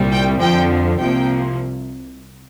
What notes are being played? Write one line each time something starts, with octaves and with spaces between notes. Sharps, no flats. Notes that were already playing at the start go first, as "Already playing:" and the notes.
Already playing: C2 A#2 G3
G5
F2 D3 F3 G5
C2 C3 F3 A#3 G5